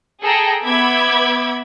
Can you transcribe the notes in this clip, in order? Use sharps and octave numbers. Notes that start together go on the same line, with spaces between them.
G#4 A4 G5 A#5
B3 E5 B5 D6 G#6